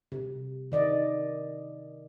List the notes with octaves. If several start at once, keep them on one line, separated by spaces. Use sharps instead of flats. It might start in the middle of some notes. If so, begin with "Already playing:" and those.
C3
D#3 D5 D#5